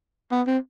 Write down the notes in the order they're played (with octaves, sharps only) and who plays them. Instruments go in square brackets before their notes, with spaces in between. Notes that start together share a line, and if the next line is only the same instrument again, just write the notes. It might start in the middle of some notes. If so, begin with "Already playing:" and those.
[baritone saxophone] B3
C4